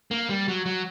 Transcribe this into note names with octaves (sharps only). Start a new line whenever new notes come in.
A#3
G3
F#3
F#3